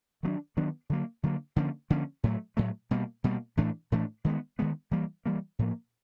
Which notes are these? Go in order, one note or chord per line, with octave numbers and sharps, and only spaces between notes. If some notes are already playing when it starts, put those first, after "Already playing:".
D#3 F#3 B3 D4
D#3 F#3 B3 D4
D3 F#3 A#3
D3 F#3 A#3
D3 F3 A#3 C#4
D3 F3 A#3 C#4
A2 F#3 A3
A2 F#3 A3
B2 G3 A#3
B2 G3 A#3
A2 E3 A3 D4
A2 E3 A3 D4
D#3 G#3 B3
D#3 G#3 B3
E3 G3 A#3
E3 G3 A#3
A2 F3 A#3